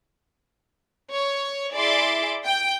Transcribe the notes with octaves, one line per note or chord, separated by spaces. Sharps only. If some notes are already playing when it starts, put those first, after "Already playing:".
C#5
E4 G#4 D5 E5 C6 D6
G5